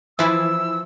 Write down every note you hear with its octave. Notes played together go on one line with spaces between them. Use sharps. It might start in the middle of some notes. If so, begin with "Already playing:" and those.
E3 F3 E4 E6